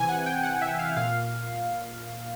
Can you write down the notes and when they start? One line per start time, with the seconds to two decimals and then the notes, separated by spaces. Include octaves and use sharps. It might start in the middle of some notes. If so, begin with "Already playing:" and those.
Already playing: C3 E3 G#5
0.09 F#5
0.26 G5
0.43 F#5
0.62 E5
0.79 F5
0.96 A#2 F5